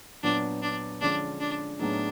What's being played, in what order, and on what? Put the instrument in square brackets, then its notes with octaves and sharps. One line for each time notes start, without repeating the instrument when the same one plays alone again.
[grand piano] A#2 F#3 B3 [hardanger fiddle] D4
[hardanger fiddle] D4
[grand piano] D3 F3 G#3 C#4 F4 [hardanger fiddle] D4
[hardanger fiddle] D4
[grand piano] A2 F#3 B3 D#4 G#4 [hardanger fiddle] D4